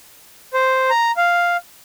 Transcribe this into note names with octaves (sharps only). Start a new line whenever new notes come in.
C5
A#5
F5